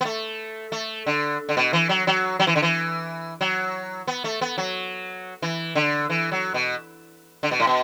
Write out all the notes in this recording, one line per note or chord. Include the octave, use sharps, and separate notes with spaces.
B3
A3
A3
D3
D3
B2
E3
F#3
F#3
F#3
E3
D3
E3
F#3
B3
A3
B3
F#3
E3
D3
E3
F#3
B2
D3
B2
A2
B2